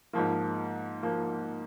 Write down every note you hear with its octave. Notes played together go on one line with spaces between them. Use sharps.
G#2 F3 A#3
F3 A#3